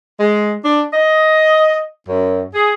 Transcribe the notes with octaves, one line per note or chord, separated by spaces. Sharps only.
G#3
D4
D#5
F#2
G#4